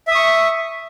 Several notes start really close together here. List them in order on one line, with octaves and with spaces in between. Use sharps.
E5 D#6 C#6